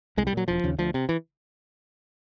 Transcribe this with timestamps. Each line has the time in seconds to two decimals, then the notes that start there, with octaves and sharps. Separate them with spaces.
0.17 C2 G#3
0.27 G3
0.33 A#2 F#3
0.48 E1 F3
0.64 D#2 C#3
0.78 D2 F3
0.94 C3
1.09 E3